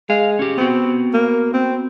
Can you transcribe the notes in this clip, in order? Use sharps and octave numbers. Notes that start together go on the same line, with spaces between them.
G#3 F5
C#4 G4
B3 C4 F#4
A#3
C4